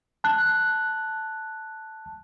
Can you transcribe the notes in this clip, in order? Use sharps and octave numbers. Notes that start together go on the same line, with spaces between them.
A5 F#6